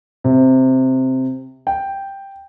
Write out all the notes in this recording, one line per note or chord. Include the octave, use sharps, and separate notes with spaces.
C3
G5